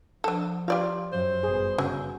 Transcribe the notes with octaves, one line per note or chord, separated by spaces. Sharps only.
D3 F3 A4
F4 G4 D5 F5
F#2 C5
G1 B2 G#4
C#3 F#3 C#4